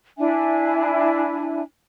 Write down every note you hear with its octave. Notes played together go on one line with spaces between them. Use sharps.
D4 E4 E5 G#5